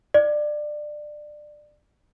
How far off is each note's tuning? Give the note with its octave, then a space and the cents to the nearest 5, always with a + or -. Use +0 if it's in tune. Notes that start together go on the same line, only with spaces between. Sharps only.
D5 +20